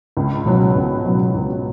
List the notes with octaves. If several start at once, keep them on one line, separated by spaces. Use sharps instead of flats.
C#2
B2 F#3
C#2
B2 F#3
C#2